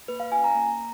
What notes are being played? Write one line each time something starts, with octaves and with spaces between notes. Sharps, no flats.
A#3 B4
F5
C#4 F4 G#5
A#5
A#3 A#5